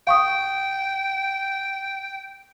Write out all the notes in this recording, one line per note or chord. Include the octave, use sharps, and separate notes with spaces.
F5 G5 C#6 D#6